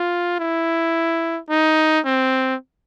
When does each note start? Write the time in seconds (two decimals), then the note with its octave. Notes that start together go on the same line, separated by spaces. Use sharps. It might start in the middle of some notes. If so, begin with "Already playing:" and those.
Already playing: F4
0.39 E4
1.50 D#4
2.05 C4